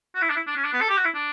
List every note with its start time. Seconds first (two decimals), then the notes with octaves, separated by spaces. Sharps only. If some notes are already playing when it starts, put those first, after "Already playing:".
0.15 F#4
0.22 E4
0.30 D4
0.36 E4
0.47 D4
0.57 C#4
0.65 D4
0.73 B3
0.81 A4
0.89 G4
0.97 F#4
1.05 E4
1.15 D4